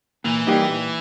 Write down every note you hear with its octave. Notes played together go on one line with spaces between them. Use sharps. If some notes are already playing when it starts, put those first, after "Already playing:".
A#2 E3
G3 A#3 D#4 G4
A#2